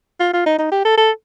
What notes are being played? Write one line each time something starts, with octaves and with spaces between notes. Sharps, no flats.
F4
F4
D#4
D#4
G4
A4
A4